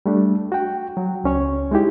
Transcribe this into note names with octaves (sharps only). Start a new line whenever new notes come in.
G3 A3 D4
F#4 G5
F#3
C#2 C#4 C#5
G#3 D#4 E4 G4